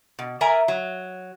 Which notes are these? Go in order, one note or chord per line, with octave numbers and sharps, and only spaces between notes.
B2
A#4 D5 E5 G#5 A#5
F#3